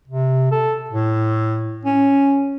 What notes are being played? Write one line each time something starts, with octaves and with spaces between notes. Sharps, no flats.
C3
A4
A2
C#4